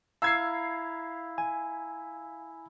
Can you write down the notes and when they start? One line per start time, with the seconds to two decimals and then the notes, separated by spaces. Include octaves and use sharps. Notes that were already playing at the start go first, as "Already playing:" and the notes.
0.22 E4 F5 A#5 E6 G#6 C7
1.38 G#5